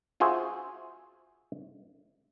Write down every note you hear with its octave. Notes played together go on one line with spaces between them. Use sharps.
F4 F#4 G#4 C5 E5